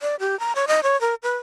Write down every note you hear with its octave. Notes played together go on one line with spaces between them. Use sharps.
D5
G4
A#5
C#5
D#5
C#5
A#4
B4